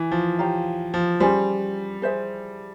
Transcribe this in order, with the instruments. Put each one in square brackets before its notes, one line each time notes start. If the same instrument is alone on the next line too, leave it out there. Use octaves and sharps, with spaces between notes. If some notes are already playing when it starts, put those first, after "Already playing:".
Already playing: [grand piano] E3 [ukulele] E5 G#5
[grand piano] F3
[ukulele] G4 C#5 F5 A#5
[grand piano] F3
[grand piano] G3 [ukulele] C#4 F4 G#4 C5
[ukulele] G#4 C5 E5